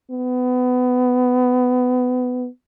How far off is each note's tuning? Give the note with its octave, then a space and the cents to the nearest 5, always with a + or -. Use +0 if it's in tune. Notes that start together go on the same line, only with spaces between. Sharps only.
B3 +20